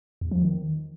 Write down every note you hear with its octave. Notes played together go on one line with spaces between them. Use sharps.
E2
F3
D#3